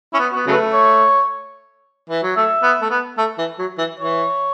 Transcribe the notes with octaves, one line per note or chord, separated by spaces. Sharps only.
C#4 E4
B3
F#4
B3
C#3 F#3 A3
B4
C#5
E3
F#3
A3 E5
B3
A3
B3
A3
E3
F#3
E3
E3 C#5